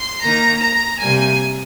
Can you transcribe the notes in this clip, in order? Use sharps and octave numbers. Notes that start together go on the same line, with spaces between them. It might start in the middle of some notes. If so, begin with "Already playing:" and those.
Already playing: C6
D#3 A#3 D#4 A#5
A#5
C3 G3 A#3 G#5